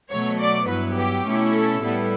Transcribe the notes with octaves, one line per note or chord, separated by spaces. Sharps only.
B2 F#3 A3 C#5
D5
G2 F#3 B3 E4 B4
G4
B2 A3 C#4 E4
A4
A2 G3 B3 E4